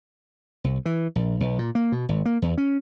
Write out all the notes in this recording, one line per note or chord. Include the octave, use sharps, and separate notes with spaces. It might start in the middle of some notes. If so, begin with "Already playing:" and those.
C2
E3
A#1
B1
A#2
A#3
B2
G#1
A#3
E2
C#4